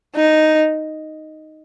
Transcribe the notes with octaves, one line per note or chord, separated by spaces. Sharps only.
D#4